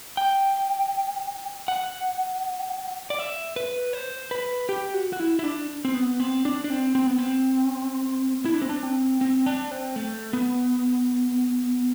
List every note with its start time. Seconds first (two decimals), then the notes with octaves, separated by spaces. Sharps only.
0.17 G5
1.68 F#5
3.10 D5
3.19 E5
3.56 B4
3.93 C5
4.31 B4
4.69 G4
4.94 F#4
5.13 F#4
5.20 E4
5.39 E4
5.44 D4
5.85 C4
5.94 B3
6.20 C4
6.45 D4
6.64 D4
6.70 C4
6.95 C4
7.06 B3
7.18 C4
8.45 E4
8.54 D4
8.62 C4
8.69 D4
8.83 C4
9.21 C4
9.46 D4
9.71 C4
9.96 A3
10.33 B3